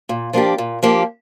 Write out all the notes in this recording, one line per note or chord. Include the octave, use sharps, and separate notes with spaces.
A#2
F3 A#3 D4 G4
A#2
F3 A#3 D4 G4